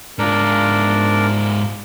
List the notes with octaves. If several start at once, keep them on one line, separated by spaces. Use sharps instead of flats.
G#2 D4 F4 A#4